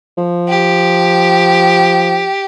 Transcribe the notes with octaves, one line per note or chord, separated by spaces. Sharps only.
F3
G4